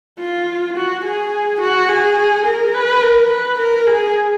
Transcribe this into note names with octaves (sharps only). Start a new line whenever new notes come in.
F4
F#4
G#4
F#4
G#4
A#4
B4
A#4
B4
A#4
G#4